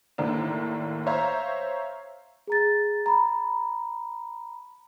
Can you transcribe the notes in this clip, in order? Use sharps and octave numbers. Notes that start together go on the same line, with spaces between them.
D#2 A2 A#3 D4
C5 C#5 E5 F5 A#5
G#4 A#5 A6
A#5 B5